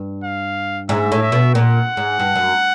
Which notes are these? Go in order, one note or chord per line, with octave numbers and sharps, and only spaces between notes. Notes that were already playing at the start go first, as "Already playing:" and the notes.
Already playing: G2
F5
G#2 E5
A2
E5
B2
A#2 F#5
G#2
G2
F#2